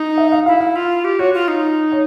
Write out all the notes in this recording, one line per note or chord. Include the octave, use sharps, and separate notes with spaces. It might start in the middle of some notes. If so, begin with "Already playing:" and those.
Already playing: D#4
E5
F5
E4 F5
F5
F4
G4
F#4 C#5
F4
D#4
C#5